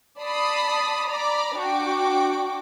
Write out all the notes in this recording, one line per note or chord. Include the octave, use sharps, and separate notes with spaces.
D5 A5 B5 D#6 C7
D5 A#5 B5 D6
D4 F#4 G5 D6